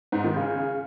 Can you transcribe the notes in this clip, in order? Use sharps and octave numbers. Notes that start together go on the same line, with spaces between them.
G#2
D#3
C#3